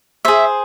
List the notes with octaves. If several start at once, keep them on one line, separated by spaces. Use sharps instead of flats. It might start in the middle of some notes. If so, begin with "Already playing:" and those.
G#4 C5 E5